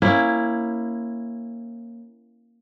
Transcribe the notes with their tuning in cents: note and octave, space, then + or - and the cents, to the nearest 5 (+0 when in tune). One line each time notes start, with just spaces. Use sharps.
A#3 +0 C#4 -20 E4 +5